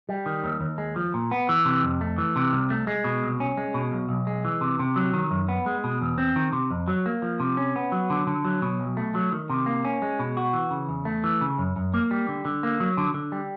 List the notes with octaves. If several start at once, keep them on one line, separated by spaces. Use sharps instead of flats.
G3
D#3
D#2
D#2
G#3
F3
A#2
B3
E3
C3
F2
A3
E3
C3
C2
A3
G#3
B2
C2
C#4
G#3
B2
B1
B1
G#3
E3
C3
C3
F#3
D#3
F#2
B3
G#3
B2
E2
C4
D#3
C3
F2
F#3
A#3
F3
C3
C#4
B3
F#3
D3
D3
F#3
B2
B1
A3
F#3
D#3
C3
A#3
C#4
G#3
B2
F#4
E3
C#3
E2
A3
E3
C#3
F#2
F#2
A#3
G3
D3
D3
A#3
F#3
D3
D3
G3